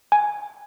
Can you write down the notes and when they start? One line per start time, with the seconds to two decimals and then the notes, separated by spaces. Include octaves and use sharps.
0.12 G#5